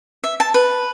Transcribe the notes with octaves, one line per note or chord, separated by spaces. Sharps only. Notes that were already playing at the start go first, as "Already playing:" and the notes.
E5
A5
B4